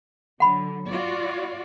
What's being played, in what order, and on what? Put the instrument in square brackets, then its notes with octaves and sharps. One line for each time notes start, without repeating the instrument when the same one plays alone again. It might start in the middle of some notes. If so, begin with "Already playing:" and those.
[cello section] D3 F#3 [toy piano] F#5 B5
[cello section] F4 F#4 D5